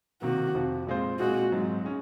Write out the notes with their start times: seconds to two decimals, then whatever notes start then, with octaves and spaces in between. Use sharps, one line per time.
0.22 C3 D#3 A#3 F#4
0.55 F2 C3 F3
0.87 A#2 G#3 C4 F4 C5
1.19 A#2 G#3 C4 D#4 F#4 G#4
1.52 G#2 F#3 C4 D#4
1.84 G#3 C#4